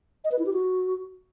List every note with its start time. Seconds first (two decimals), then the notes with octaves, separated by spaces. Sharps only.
0.24 D#5
0.32 B4
0.39 E4
0.46 G4
0.53 F#4